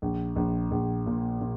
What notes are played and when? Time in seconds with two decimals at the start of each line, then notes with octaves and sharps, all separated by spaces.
0.02 A#1
0.36 A#1
0.71 A#1
1.06 A#2
1.41 A#2